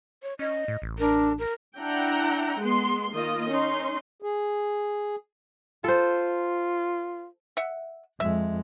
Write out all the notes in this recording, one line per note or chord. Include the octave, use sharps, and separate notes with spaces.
C#5
C#4 D#5
A2
A1
D4 A#4
A#4
D4 E4 F#5 G5 A#5
G#3 B3 C6
D#3 A#3 F4 D#5
C#4 D#4 C6
G#4
F4 A4 C5
E5 F#5
F2 G#3 E5